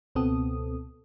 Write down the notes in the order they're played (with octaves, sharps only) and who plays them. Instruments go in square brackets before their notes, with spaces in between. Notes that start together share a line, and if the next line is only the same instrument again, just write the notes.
[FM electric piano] C#2 B2 B3 C4 A4 D#6